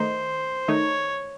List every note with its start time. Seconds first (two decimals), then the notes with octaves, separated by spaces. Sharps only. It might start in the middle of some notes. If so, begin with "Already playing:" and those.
Already playing: D#3 A3 D#4 C5
0.68 D#3 A3 D#4 C#5